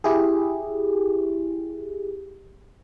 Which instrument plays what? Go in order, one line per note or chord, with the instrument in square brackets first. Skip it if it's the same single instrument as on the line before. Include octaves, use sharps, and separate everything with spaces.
[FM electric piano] E4 G4 G#4